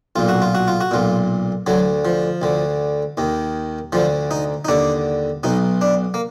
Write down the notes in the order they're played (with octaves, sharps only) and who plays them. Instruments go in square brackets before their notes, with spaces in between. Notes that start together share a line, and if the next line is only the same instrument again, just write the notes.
[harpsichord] B1 A#2 F4
F#4
F4
F#4
F4
F#4
B1 A#2 F4
D2 D3 F#3
F3
D2 D3
D#2 D#3
D2 D3 F3
D#4
D#4
D#2 D3 D4
B1 B2 D#4
D4
A#3